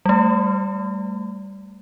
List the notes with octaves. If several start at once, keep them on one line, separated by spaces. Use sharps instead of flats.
G3 A3